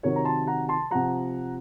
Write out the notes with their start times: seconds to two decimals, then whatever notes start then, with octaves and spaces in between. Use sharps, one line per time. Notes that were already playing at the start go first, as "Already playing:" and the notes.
0.03 C3 D#3 F#3 A#4 C#5
0.16 A#5
0.25 A5 C6
0.47 F#5 A#5
0.69 A5 C6
0.91 C3 F3 F#5 A#5